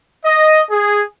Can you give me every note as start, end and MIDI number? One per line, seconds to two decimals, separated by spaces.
0.24 0.61 75
0.70 1.03 68